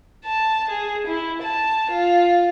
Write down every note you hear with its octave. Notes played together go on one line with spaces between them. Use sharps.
A5
G#4
E4
A5
F4